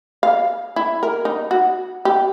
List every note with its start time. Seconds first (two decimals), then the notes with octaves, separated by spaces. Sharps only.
0.23 F5
0.76 E4
1.03 A#4
1.25 D#4
1.51 F#4
2.05 G4